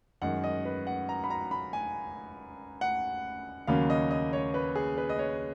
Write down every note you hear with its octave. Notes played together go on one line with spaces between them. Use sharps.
F#2 D#3 G#3 F#5
D#5
B4
F#5
A#5
B5
A#5
B5
G#5
F#5
D#2 C#3 F#3 A#3 C#4 F5
D#5
D#5
C#5
B4
G#4
B4
D#5
C#5